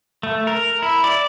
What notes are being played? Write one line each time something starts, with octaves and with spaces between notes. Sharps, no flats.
A3
A#4
E4
D5